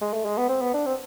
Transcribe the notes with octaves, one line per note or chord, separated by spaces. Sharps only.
G#3
A3
G#3
B3
C4
B3
D4
C4